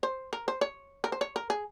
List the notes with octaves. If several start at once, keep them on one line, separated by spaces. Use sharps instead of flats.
C5
A#4
C5
C#5
A#4
C5
C#5
A#4
G#4